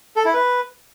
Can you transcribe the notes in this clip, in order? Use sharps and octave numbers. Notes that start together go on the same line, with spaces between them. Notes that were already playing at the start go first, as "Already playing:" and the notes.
A4
E4
B4